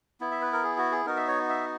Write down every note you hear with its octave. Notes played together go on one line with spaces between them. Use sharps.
B3 E4
E5
B4
A#4
G#4
F#4
G#4
B3 D#4 F#4 A#4
E5
C#5
E5